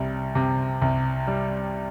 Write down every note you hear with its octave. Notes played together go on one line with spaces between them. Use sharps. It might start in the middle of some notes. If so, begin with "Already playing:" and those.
Already playing: C2 G3
C3
C2
G3